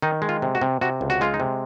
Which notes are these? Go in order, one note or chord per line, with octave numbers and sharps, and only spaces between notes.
D#3 D#4
G#3
F4
C3
F#4
C3
C3 F#4
C#2
F#4
G#3 F4
D#4
C3